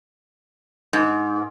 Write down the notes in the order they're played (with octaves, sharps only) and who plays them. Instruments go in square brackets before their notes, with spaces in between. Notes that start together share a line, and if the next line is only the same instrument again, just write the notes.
[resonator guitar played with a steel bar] G#2